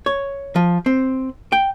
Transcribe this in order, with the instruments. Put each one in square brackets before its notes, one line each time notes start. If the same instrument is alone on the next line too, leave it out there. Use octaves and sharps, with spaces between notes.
[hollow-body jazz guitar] C#5
F3
C4
G5